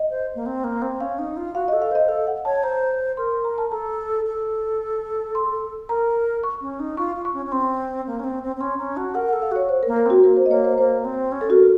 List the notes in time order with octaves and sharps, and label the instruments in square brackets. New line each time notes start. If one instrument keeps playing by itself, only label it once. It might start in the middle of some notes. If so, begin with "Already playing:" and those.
Already playing: [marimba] D#5
[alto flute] C5
A#3
C4
A#3
C4
[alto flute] C#4 [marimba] F5
[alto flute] D#4
F4
[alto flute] F#4 [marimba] F5
[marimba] D#5
[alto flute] A4
[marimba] F5
[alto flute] C5 [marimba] D#5
[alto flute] A4 [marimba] F5
[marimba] F#5
[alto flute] C#5 [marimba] A5
[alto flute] C5 [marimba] A#5
[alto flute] A#4 [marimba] C6
[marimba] C6
A#5
A5
[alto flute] A4 [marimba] A#5
[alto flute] A4
[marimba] C6
[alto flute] A#4 [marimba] A#5
[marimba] C#6
[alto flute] C#4
D#4
[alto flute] F4 [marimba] C#6
[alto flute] F4
[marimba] C#6
[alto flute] C#4
C#4
[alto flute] C4 [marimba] C6
[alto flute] A#3
C#4
C4
C4
C4
[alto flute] C#4 [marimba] C6
[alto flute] C#4 [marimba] A#5
[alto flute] F#4 [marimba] A5
[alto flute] A#4 [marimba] F#5
[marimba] F#5
[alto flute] A4
[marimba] F5
[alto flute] F#4 [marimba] C#5
[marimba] C5
A#4
[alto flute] A#3
[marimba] A#4
[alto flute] C4 [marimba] F#4
[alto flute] A#3 [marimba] A#4
[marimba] C5
D#5
[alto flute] A#3 [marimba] C#5
[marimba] C5
[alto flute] A#3 [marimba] C5
[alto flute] C4
C#4
[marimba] A4
[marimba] F#4 [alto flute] A#4